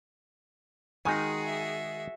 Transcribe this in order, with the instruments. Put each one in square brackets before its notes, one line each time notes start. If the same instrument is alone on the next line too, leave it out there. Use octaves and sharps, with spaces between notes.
[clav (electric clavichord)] D#3 G#3 D#4 [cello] F#4 G#4 [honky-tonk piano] G#5
[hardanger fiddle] E5